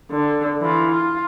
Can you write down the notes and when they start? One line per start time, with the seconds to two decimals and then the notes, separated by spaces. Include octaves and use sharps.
0.11 D3
0.61 E3 F4
0.91 F4